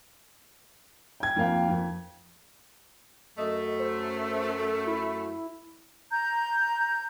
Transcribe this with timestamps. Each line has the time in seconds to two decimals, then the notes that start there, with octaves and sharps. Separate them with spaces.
1.20 G5 G#6
1.36 F2 A#3 F5 G5
1.69 F2
3.38 F#2 A3 D#5
3.79 C5
4.87 E4
6.11 A#5 G6